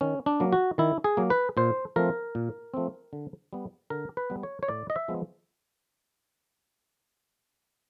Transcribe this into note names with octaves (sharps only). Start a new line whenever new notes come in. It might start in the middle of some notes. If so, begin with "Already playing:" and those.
D#3 C#4
D4
F#3 A#3
F#4
D#3 E4
G#4
F#3 A#3
B4
A#2 C5
F3 A3 C4 A#4
A#2
F3 A3 C4
D3
G3 B3
D3 A#4
B4
G3 B3
C#5
C#5
A2 D5
D#5
E5
F3 G#3 B3